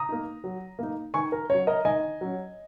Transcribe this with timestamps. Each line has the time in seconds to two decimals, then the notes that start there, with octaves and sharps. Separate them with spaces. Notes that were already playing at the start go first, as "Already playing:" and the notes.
Already playing: A#5 D#6
0.09 A#3 D#4
0.44 F#3
0.79 A#3 D#4
1.14 D#3 G#5 C#6
1.32 A#4
1.50 F#3 C#4 C#5
1.67 A#4 D#5
1.85 D#3 D#5 G#5
2.21 F#3 C#4